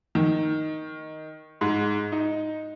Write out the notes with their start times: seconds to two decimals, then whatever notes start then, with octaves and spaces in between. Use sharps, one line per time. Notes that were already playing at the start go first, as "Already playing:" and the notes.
0.15 D#3
1.61 G#2
2.12 D#4